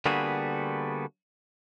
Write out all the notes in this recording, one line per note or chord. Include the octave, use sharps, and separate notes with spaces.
D3 G3 A#3 B3 F#4 G#4